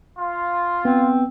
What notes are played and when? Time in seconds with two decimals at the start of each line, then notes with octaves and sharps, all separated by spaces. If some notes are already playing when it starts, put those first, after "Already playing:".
0.18 F4
0.85 B3 C4